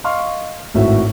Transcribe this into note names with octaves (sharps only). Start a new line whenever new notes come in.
D#5 F5 C6 C#6 F6
G#1 A2 F#4 E5